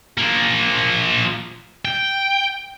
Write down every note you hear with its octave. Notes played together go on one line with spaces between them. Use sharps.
F3 A#3
G5